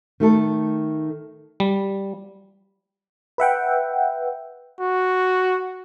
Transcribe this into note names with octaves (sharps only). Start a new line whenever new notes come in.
D#3 A3 A4
G3
B4 E5 F#5 G5
F#4